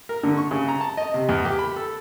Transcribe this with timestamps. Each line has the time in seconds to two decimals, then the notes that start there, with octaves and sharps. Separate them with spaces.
0.09 A#4
0.23 D3
0.37 C#6
0.51 C#3
0.68 A#5
0.81 A5
0.97 D#5
1.14 C3
1.29 E2
1.45 G4
1.59 B5
1.76 A4